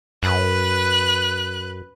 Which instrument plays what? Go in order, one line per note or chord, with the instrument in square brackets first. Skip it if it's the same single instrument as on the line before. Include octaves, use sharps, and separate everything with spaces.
[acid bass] F#2 [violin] B4 F#6